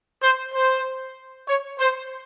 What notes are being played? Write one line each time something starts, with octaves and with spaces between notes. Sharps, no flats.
C5
C5
C#5
C5